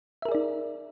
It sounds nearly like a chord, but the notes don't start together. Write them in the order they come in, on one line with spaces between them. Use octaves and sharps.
E5 A#4 G#4 D5 D#4